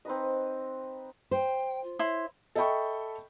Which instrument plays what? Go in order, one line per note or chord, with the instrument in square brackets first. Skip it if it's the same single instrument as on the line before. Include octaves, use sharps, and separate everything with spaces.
[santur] C4 D#4 B4 D#5
[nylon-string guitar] C5 [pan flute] G5
[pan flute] F4
[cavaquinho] E4 C6 [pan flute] C#5
[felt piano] A4 D#5 E5 G5 B5 C#6